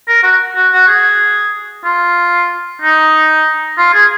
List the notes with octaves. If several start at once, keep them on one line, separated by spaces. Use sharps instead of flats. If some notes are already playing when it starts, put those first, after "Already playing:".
A#4
F#4
F#4
F#4
G#4
F4
D#4
F4
G#4